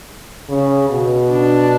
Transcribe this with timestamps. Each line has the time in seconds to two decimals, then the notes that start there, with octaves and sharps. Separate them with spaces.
0.49 C#3
0.90 B2
1.31 D4